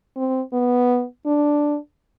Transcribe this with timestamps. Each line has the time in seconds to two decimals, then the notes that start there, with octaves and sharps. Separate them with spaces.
0.16 C4
0.53 B3
1.26 D4